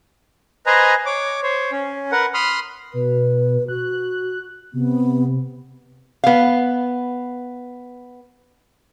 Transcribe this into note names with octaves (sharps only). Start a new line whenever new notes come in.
B4 C5 D#5 G#5 A#5
C#5 D6
C5 C#5
C#4
A#4 B4 F#5
B5 C6 D#6 F6
B2 B4
F#4 F#6
C3 B3
B3 F5